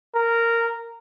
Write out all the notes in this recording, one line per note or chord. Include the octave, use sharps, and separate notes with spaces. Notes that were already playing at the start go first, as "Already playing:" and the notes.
A#4